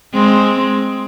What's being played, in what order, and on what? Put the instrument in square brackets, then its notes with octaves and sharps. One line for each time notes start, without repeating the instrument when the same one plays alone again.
[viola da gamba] G#3 C4